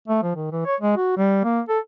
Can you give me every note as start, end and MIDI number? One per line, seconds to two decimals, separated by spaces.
0.08 0.22 57
0.23 0.35 53
0.36 0.51 51
0.52 0.62 52
0.66 0.75 73
0.81 0.96 56
0.97 1.16 66
1.17 1.41 55
1.44 1.61 58
1.69 1.79 69